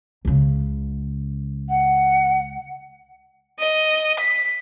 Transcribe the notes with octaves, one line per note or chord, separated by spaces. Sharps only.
C#2 C#3
F#5
D#5
B6